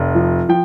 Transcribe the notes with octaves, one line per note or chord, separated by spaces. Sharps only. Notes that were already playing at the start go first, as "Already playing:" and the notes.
Already playing: F1
F3
F3 G5